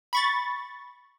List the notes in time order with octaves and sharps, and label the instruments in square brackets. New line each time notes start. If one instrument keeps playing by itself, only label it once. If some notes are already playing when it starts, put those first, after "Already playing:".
[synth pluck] B5 C#6 A6